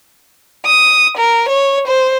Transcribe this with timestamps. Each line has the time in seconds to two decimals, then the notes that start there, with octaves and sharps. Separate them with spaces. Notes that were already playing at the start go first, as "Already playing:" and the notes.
0.66 D#6
1.17 A#4
1.49 C#5
1.88 C5